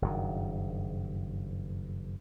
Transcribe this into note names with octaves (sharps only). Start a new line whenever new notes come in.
F#1 G2 D#3